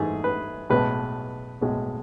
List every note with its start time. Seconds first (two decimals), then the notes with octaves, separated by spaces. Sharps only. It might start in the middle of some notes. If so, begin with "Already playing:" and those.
Already playing: G#2 E3 A3 G#4
0.24 B4
0.70 B1 A2 G#3 B4
1.61 B1 A2 G#3